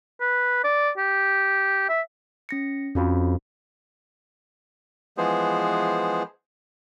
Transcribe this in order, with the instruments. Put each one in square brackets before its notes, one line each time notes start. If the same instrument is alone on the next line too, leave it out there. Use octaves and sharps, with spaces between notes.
[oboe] B4
D5
G4
E5
[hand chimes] C#4 A#6 C#7
[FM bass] F2 [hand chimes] C#4 F#4 B5
[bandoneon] E3 F3 G#3 B3 G#4 C5